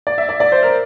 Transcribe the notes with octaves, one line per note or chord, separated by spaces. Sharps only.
D5
E5
D5
D5
C5
A#4